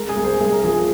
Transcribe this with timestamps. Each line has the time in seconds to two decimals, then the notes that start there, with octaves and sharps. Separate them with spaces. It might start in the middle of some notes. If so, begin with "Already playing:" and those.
Already playing: G#3 A#4
0.09 G#4
0.17 C2
0.25 G#4 C5
0.40 C2 G#4
0.52 A#4
0.64 F3 G#4